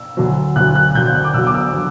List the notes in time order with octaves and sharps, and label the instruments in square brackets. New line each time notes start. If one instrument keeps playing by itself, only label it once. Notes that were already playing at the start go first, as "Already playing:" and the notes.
Already playing: [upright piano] E6
D2 D3 F#3
D2 D3 F#3 F#6
F#6
D2 D3 F#3 G6
F#6
F#6
D6
D2 D3 F#3 E6
D6
E6
D3 F#3